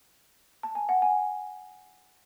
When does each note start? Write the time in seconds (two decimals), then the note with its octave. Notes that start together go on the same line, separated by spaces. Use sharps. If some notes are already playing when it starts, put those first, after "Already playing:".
0.63 A5
0.75 G#5
0.89 F#5
1.02 G#5